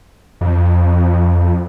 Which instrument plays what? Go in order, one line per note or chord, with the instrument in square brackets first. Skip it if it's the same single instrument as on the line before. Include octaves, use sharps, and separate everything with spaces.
[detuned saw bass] F2